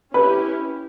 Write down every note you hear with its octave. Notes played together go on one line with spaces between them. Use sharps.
C#4 E4 G4 B4